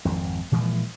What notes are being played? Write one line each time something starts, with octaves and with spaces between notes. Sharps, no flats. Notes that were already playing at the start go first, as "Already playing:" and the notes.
G#1 F2
A#2 E3 F3 G#3